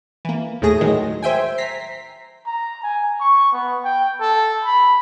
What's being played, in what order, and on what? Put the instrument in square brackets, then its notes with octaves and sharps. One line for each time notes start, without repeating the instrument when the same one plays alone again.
[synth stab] E3 A#3
D#2 A2 A3 G#4 A#6
A2 D#3 F#3 G#3
C5 E5 G5 G#5
A#5 B6 C7
[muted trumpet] A#5
G#5
C#6
B3
G5
A4
B5